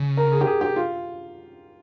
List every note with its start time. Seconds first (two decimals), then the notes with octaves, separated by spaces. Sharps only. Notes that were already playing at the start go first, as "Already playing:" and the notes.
Already playing: C#3
0.17 A#4
0.32 G#4
0.41 G4
0.47 G#4
0.61 G4
0.76 F4